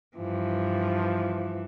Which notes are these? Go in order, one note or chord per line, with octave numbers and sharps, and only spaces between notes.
G2 E3 F3